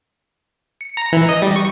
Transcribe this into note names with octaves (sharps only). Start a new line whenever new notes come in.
C#7
A#5
E3
D#5
G3
C#6